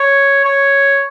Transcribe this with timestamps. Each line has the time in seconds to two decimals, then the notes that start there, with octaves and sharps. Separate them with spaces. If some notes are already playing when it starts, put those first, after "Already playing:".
Already playing: C#5
0.45 C#5